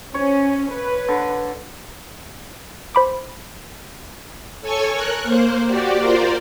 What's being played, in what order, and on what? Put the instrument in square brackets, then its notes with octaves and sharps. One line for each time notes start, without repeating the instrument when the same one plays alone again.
[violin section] C#4 [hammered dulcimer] C#5
[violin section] B4
[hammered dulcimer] D3
[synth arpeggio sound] C5 B5 D6
[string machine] A4 C#5 G#5 C#6
A#4 F#6
A#3 C5
F#4 G4 D5
F4 A#4 C5 D5